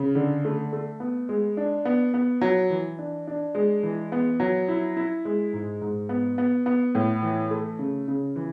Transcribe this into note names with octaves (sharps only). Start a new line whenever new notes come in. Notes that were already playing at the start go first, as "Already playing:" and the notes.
Already playing: C#3
D3
A3
A3
B3
G#3
D4
B3
B3
F#3
E3
D4
D4
G#3
E3
B3
F#3
E4
E4
G#3
G#2
G#2
B3
B3
B3
A2
E3
A3
C#3
C#3
E3